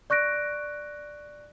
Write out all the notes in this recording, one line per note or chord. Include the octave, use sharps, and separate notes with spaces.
D5 C#6 F#6 A#6 D7